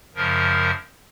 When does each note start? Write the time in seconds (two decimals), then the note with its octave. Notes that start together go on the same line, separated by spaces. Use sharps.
0.15 F#2 C#3 F3 A#4